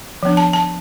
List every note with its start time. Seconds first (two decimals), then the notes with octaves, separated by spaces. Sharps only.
0.23 F3 B3 D4
0.37 A5
0.53 A5